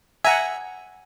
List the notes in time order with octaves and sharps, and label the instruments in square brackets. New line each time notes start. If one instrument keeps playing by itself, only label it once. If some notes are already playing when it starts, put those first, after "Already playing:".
[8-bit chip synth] E5 A#5 [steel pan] F#5 G#5